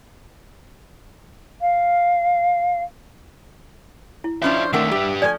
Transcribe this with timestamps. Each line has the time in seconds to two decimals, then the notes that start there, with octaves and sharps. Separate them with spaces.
1.61 F5
4.24 E4
4.42 F3 C#4 D4 F4 C5 E5
4.73 D#3 A3 C4 D4 A#4 E5 F#5 E6
4.91 G3 G4 B4
5.22 F3 A3 D5 G#5